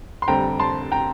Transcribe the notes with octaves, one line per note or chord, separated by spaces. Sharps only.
C6
F1 F2 D3 G3 C4 G5 A#5
A5 C6
G5 A#5